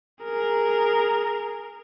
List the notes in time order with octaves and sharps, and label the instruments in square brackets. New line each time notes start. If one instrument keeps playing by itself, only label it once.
[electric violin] G#4 A#4